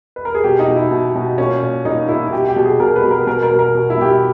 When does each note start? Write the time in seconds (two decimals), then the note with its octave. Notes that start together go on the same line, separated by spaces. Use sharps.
0.16 B4
0.25 A#4
0.35 G#4
0.44 B2 G4
0.59 D#4
0.68 B2
0.75 E4
0.91 B2
1.15 B2
1.38 A#2 C#4
1.62 A#2
1.85 A#2 D#4
2.08 A#2 E4
2.26 E4
2.32 B2 G4
2.49 G4
2.56 B2
2.65 G#4
2.80 B2 A#4
2.96 B4
3.04 B2
3.11 A#4
3.27 B2 A#4
3.43 A#4
3.51 B2
3.59 A#4
3.75 B2
3.90 E4
3.97 B2 G4
4.05 E4